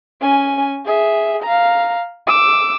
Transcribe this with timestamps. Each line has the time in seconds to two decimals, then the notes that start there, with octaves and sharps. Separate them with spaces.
0.21 C#4 G#5
0.86 G#4 E5
1.43 F5 A#5
2.27 D6 E6